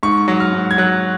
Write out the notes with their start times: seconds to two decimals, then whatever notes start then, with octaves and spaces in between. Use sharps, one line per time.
0.03 G#2 C#6
0.28 F#3
0.40 F6
0.53 G#2
0.71 G#6
0.78 F#3 F#6